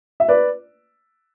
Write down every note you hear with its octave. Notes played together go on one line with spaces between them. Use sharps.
E5
B4 D5